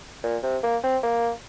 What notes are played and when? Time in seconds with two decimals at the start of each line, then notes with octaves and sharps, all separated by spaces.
0.23 A#2
0.43 C3
0.63 A#3
0.83 C4
1.03 A#3